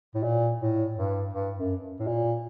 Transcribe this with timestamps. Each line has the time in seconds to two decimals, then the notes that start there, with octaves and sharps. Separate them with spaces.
0.15 A2
0.23 A#2
0.60 A2
0.97 G2
1.33 G2
1.57 F#2
2.00 A2
2.07 A#2